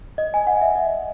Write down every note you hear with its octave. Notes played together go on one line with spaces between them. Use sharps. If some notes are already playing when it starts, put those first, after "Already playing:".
D#5
G#5
F#5
E5
D#5